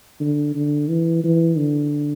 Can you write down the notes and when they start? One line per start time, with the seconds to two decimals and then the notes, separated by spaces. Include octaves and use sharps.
0.20 D3
0.55 D3
0.89 E3
1.24 E3
1.57 D3